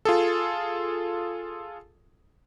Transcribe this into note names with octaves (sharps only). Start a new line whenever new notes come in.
F4 G#4 A4